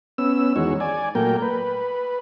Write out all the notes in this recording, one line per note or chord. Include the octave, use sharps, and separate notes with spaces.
B3 C#4 E6
E2 D#3 G#3 F#4 C#5
D5 G#5
A#2 F#3 A3 A#3 A#4 G5
B4